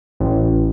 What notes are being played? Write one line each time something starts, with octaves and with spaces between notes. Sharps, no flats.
A1